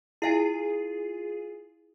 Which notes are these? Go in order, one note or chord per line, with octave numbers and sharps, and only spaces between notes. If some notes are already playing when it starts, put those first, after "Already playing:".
E4 F4 G#4 F5 G#5